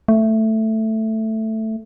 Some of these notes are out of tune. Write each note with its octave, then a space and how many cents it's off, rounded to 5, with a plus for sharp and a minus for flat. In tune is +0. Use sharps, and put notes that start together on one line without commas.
A3 +5